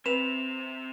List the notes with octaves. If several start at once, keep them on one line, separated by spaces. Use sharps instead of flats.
C3 C4 B4 E7 F7